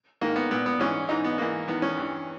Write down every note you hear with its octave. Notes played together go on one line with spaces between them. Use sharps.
G#2 D#3 A#3
B3
A#2 B3
B3
G#2 E3 C#4
G#2 E3 D#4
B3
G#2 E3 A#3
E2 D#3 B3
C#4
G2 E3